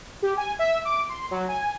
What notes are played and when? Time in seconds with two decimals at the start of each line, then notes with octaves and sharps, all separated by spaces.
0.22 G4
0.37 G#5
0.59 E5
0.85 D6
1.09 C6
1.31 F#3
1.48 G#5